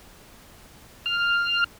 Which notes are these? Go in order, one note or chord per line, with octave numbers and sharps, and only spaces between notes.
F6